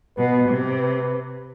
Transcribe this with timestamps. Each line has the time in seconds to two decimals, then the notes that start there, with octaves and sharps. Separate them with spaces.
0.17 B2 B4
0.48 C3
0.78 B4